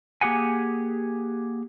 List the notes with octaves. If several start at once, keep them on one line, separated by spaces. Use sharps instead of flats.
A#3 G4 G#4 F#5 G#5